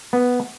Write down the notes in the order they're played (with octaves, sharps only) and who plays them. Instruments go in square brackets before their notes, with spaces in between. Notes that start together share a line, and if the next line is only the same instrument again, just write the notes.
[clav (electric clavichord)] B3